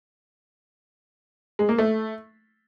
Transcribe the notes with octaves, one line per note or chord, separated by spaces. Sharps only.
G#3
A#3
A3